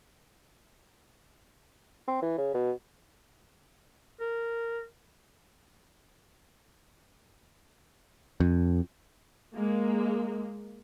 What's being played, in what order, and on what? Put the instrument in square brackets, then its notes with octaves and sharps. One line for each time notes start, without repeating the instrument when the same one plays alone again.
[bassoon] C4
E3
C#3
B2
[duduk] A#4
[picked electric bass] F2
[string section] G#3 A#3